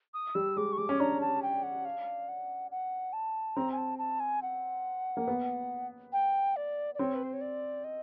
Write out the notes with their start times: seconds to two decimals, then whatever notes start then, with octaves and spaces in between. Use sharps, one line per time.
0.14 D#6
0.35 G3 E6
0.57 G#3 D6
0.73 C#6
0.78 G#3 D6
0.89 C#4
1.00 D4 A#5
1.21 A5
1.42 G5
1.63 F#5
1.85 F5
2.28 F#5
2.71 F#5
3.13 A5
3.56 C4 A#5
3.72 G#5
3.78 A5
3.99 A5
4.20 G#5
4.42 F#5
5.17 A#3
5.28 B3
6.12 G5
6.56 D5
6.95 D5
6.99 C4 C#5
7.15 B4
7.23 C5
7.33 C#5
7.41 D5
7.84 D#5